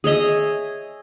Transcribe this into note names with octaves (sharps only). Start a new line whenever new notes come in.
G#4 C#5 D#5 E5